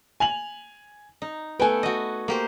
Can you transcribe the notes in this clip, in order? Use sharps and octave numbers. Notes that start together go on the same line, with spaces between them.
G#5 F7 F#7
D#4
A3 B3 B4 G5 G#5
F#4 D#5
A#3 G4 C5